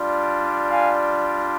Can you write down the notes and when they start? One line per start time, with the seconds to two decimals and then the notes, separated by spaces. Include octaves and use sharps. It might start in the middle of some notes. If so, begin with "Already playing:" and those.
Already playing: G3 D4 F4
0.70 F5 G#5